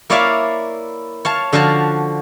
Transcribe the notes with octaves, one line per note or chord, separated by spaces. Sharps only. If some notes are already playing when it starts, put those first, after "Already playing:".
A#3 E4 C#5 D5 E5 F5
C#5 F5 A5
D3 F3 F#4 F5 A5